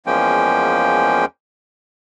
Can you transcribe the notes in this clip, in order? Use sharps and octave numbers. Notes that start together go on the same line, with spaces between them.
E2 F3 G#3 A#3 C#4 G5